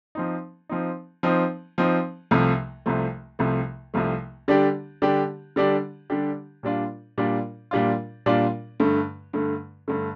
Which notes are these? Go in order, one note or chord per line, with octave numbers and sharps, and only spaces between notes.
F3 C4 D#4
F3 C4 D#4
F3 C4 D#4
F3 C4 D#4
C2 C3 F3 A3
C2 C3 F3 A3
C2 C3 F3 A3
C2 C3 F3 A3
D3 G3 D4 G4
D3 G3 D4 G4
D3 G3 D4 G4
D3 G3 D4 G4
A#2 G3 D4 F4
A#2 G3 D4 F4
A#2 G3 D4 F4
A#2 G3 D4 F4
G2 D3 A3
G2 D3 A3
G2 D3 A3